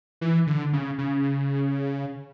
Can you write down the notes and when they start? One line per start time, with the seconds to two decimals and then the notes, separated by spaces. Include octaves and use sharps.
0.21 E3
0.47 D3
0.73 C#3
0.98 C#3